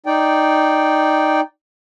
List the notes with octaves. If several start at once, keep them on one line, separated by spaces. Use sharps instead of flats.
D#4 D5 G5